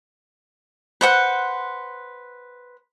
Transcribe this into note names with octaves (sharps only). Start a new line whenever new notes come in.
B4 C5 F#5